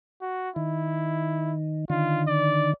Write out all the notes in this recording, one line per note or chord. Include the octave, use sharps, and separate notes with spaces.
F#4
D#3 E4
D3 D#3 F4
D5